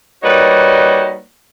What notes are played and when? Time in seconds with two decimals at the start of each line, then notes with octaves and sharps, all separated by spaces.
0.23 G3 A#3 D#4 F#4 B4 C#5